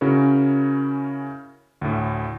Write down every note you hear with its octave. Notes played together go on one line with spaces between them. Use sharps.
C#3 C#4 E4 F#4 A#4
D2 A2